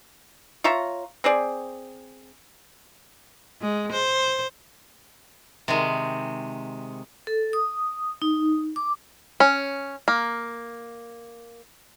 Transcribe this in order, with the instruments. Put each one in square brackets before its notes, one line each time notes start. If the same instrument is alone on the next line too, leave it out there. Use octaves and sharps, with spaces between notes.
[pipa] F4 C#5 E5 A#5
C4 G#4 D5
[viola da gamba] G#3
C5
[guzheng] C3 D#3 G#3
[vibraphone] A4
D#6
D#4
D6
[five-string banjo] C#4
A#3